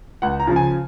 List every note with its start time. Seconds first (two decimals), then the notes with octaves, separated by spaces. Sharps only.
0.22 C#2 F#5
0.40 A#5
0.47 C#3 F3
0.56 G#5